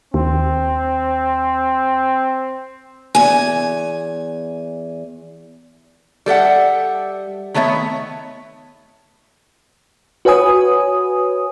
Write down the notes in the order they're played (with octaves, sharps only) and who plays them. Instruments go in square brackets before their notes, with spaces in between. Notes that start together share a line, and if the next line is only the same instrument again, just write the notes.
[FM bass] D#2 [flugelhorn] C4
[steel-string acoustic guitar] E2 G#5
[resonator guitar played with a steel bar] G3 A4 E5 F#5
D#3 A3 B3 C#5 E5
[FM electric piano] F#4 B4 C#5 G#5 D#6